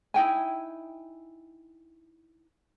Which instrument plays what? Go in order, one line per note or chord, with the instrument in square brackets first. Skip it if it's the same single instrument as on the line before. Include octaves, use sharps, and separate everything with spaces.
[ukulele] D#4 E4 G5 G#5